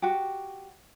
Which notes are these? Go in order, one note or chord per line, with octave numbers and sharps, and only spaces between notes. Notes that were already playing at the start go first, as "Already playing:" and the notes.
F#4 G4